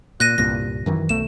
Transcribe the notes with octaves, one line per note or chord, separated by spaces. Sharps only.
A#2 F#6 A#6 D#7
C2 G2 A#2 A#6
F#2 D#3 E3
B1 A3 E7